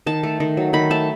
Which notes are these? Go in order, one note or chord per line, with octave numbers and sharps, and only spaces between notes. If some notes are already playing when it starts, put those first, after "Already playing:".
D#3 A5
A3
D#3
F#3
D#3 B5
A3 A5